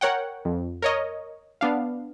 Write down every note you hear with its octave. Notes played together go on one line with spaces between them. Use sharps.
A#4 C#5 F#5 G5
F2
A#4 C#5 D#5
B3 D4 F5